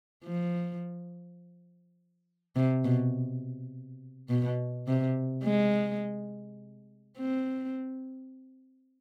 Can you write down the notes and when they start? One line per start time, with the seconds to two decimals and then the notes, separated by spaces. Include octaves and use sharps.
0.24 F3
2.56 C3
2.85 B2
4.29 B2
4.87 C3
5.44 G#3
7.18 C4